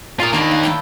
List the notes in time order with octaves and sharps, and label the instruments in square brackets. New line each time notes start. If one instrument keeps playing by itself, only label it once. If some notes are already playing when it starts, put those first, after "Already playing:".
[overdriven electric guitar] F4 A#4 [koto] G#4 C#5 D5
[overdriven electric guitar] D#3 A#3 [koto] D4 B4 F5
[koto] F4
E4 G5 A5